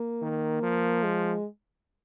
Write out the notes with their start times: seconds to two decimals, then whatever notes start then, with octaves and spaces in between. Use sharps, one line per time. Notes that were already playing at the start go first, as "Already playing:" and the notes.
Already playing: A#3
0.22 D#3
0.62 F3
1.03 G#3